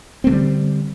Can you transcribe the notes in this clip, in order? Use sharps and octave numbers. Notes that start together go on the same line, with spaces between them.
D3 G3 A3 C4